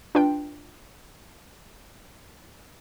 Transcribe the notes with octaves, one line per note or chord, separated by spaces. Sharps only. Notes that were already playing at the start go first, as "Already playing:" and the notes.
D4 F4 B4 G5